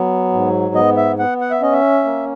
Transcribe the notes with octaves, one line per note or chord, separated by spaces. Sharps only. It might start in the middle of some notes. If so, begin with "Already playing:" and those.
Already playing: F#3 B3
G#2
B3 D#5
E5
B3 F#5
F#5
E5
C#4 D#5
E5
A#3